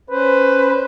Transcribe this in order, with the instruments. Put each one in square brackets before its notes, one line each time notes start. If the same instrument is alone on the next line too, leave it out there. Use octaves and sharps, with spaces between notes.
[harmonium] C#4 C5 [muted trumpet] B4